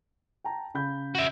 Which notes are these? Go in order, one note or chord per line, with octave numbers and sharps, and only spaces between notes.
G5 A5 A#5
C#3 B5 G6
F#4 E5